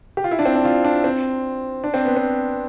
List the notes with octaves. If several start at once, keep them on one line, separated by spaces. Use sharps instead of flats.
G4
F4
E4
D4
C4
D4
F4
D4
C4
D4
C4
B3
C4